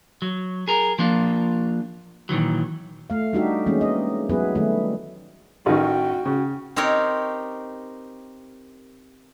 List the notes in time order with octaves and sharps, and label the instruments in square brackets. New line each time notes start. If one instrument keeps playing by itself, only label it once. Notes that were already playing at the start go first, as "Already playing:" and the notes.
[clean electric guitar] F#3
G#4 A#4
F3 A#3 D4 F4
A#2 D#3 E3 F#3
[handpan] A3 F5
G3 D4 D#4 F#4 G4 E5
E3 G#3 A#3 C#4
D#5
F#3 B3 E4 G#4 B4
D#3 G3 A3 E4
[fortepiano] A1 D#3 [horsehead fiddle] F#4 G5
[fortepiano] C#3
[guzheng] C4 D#4 G4 A#4 C#5